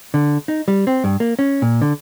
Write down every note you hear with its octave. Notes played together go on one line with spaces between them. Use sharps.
D3
D#4
G3
C4
G2
A#3
C#4
A#2
D3